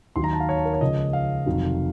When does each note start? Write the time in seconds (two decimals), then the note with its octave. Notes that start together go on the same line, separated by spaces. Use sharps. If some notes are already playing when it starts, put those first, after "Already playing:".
0.16 D#2 D#3 F#3 C6
0.24 A#5
0.33 A5
0.40 F5
0.49 C#5
0.57 A5
0.65 A#4
0.73 C#5
0.81 C#2 C#3 F3 D#5
1.13 F5
1.46 F1 F2 D#3 F#3